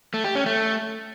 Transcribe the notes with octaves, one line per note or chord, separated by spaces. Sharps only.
A3
G4
C#4
A3